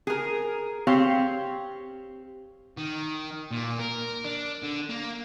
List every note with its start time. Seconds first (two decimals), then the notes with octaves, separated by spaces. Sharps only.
0.07 G#4 A#4
0.87 C4 G4 C#5 F5
2.78 D#3
3.51 A#2
3.79 A#4
4.25 D4
4.63 D3
4.90 A#3